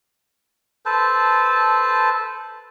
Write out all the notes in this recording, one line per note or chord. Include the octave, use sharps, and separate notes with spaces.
A4 B4 C5 A5